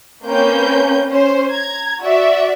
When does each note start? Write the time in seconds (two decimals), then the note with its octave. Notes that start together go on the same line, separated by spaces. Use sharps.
0.24 A#3 C4 C#4 B4 G6
1.07 C#4 C5
1.51 A#5 G#6
2.00 F#4 D5 E5